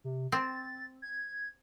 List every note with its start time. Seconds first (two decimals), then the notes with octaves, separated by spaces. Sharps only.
0.04 C3
0.32 C4 A6
1.02 G#6